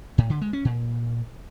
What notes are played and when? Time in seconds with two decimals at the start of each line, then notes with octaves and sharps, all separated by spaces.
0.18 A2
0.30 D3
0.41 G#3
0.53 C#4
0.65 A#2